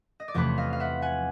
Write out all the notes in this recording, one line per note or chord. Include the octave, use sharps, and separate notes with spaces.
D#5
D5
E2 C3 F3 A3 B4 C#5
D#5 F5
F5
E5 F#5
F#5 G#5